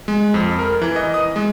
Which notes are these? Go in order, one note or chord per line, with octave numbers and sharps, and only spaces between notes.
G#3
F2
A#4
E3
D#5
D#6
G#3